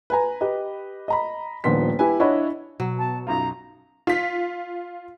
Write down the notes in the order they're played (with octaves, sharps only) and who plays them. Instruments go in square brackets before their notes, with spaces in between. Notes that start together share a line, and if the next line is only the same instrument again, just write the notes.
[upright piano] B4 G#5 A#5
G4 B4 D#5
D#5 A#5 B5
D#1 A#1 D#3 B3 C6 B6
E4 G4 B4 G#5
D4 E4 C#5 D#5 F#5 B5
[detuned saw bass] B2 [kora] F#3
[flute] A5
[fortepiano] B1 F#2 F4 [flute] A#5
[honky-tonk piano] F4 B6